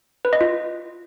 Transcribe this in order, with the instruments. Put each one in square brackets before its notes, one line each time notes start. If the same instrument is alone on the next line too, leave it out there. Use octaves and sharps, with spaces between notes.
[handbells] B4
D#5
F4